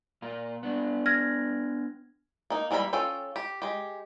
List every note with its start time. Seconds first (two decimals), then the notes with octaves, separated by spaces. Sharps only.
0.22 A#2 A#3 F4
0.63 B3 D4
1.06 F6 G#6 A#6
2.50 A#3 D#4
2.71 E3 G3 A#3 F#4 B5
2.93 C#4 F4 A4 G5
3.36 G4
3.62 G#3 G4